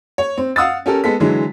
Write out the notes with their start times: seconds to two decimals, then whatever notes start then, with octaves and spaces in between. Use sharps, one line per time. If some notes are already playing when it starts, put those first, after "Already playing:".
0.18 C#5
0.38 C4
0.56 F5 F#5 D#6 E6 A6
0.86 C#4 G4 A4 A#4
1.04 G#3 B3 A4 B6
1.20 D3 E3 F#3 G#3